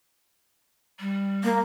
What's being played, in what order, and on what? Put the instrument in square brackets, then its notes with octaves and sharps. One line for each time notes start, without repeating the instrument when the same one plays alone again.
[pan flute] G3
[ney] A#3